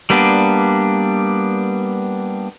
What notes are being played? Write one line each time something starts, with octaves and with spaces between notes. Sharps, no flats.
G3 A#3 B3 D4